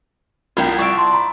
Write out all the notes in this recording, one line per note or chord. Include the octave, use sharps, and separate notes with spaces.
C2 E4 F4 A#4 G5
D5 E5 C#6 D7
A5 C6
A#5 B5